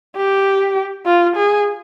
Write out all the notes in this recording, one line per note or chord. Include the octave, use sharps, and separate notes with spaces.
G4
F4
G#4